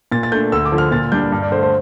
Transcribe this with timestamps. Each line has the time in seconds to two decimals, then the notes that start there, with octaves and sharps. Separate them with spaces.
0.12 A#2 A6
0.23 A6
0.32 A3 D4 G6
0.52 D2 E6
0.65 D6
0.72 D3 F3
0.78 F6
0.92 A#2 A6
1.12 G3 D4 G6
1.32 G2
1.42 D5
1.52 D3 C5
1.57 A3
1.63 C5